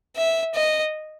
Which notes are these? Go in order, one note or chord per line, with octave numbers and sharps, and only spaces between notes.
E5
D#5